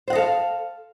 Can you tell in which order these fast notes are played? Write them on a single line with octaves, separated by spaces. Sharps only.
C5 F#5 D#5 A4 F5